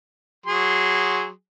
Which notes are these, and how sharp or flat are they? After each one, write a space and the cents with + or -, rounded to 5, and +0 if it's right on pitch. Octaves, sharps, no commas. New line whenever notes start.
F#3 +0 G#4 -15 C6 +0